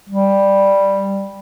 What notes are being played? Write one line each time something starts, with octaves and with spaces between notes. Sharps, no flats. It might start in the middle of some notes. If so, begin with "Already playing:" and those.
G3